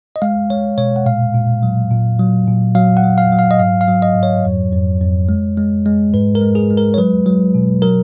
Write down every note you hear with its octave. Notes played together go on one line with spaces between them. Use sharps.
D#5
G#3 F5
G#3 C#5
B2 C#5
F#5
A#2 F5
A#2
F#3
A#2
F#3
A#2
F#3 F5
F#5
F#3
F5
F#3
F5
D#5
G#2 F5
F5
F#3
D#5
G#2
C#5
F2
F2
F2
G#3
G#3
G#3
G#2 B4
A#4
G#3
G#4
G#3
A#4
C#5
F#3 B4
F#3
B2
F#3 A#4